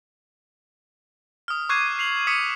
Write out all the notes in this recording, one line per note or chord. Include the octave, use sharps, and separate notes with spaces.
D#6 F6
C#6 D6 F#6 G#6 C7 D#7
C7 F7 F#7
D6 D#6 B6 C#7 D#7